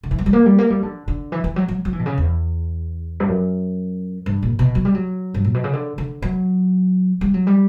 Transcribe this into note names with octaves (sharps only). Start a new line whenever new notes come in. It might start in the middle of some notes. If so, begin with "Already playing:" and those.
D3
E3
F#3
G3
A#3
G3
A#3
G3
D3
D3
E3
E3
F#3
F#3
F#3
E3
B2
C#3
E2
G2
F#2
G2
A#2
B2
F#3
G3
F#3
G2
A#2
B2
C#3
D3
D3
F#3
G3
F#3
G3